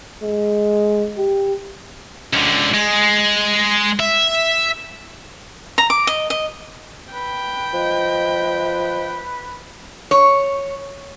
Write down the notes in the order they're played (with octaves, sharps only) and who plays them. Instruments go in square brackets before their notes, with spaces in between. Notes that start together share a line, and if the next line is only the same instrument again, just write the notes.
[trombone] G#3
G4
[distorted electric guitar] C#2 D3
G#3
E5
[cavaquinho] A#5
D6
D#5
D#5
[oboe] B4 [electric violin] G5
[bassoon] F3 [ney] D#5
[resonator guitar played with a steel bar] C#5